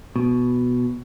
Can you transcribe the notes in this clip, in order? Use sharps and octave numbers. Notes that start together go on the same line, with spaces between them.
B2